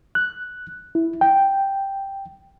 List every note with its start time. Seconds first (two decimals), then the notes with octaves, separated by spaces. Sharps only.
0.15 F#6
0.95 E4
1.21 G5